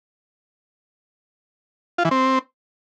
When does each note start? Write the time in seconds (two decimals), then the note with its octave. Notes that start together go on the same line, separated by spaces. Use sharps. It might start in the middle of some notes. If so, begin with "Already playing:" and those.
1.98 F4
2.05 E3
2.11 C4